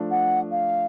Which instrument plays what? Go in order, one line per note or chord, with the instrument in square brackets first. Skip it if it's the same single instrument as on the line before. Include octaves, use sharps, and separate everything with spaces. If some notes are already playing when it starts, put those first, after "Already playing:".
Already playing: [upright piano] F3 A3 D4
[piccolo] F#5
F5